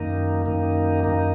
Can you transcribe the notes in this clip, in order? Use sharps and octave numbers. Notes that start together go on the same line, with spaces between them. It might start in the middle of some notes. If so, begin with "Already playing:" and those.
Already playing: F#2 D#3 A#3 D#4
F#2 D#3 A#3 D#4
F#2 D#3 A#3 D#4